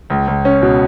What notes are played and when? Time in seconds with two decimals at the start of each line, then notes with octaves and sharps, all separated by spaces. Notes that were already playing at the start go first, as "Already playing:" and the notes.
0.10 C#2
0.27 C#2
0.45 C#4
0.62 B2